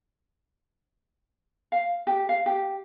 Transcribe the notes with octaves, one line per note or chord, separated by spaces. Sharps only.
F5
G4
F5
G4